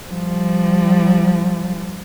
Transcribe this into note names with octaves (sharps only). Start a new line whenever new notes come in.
F3 G3